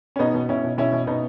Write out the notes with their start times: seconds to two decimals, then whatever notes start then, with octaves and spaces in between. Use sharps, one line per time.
0.16 C#4
0.19 B2 B3 D#4
0.34 B2
0.49 B2 C#4 E4
0.64 B2
0.78 B2 C#4 E4
0.92 B2
1.07 B2 B3 D#4